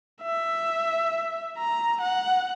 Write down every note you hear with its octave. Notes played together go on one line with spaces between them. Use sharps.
E5
A#5
F#5